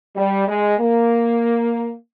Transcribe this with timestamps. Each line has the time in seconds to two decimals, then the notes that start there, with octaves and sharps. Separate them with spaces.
0.16 G3
0.48 G#3
0.79 A#3